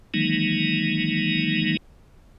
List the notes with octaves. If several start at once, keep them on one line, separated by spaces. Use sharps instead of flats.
D#3 E3 F#3 G#3 A#3 D#4